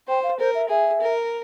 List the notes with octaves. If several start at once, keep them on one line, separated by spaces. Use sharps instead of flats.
C5 G5
F5
A#4 C5
E5
G#4 E5
A#4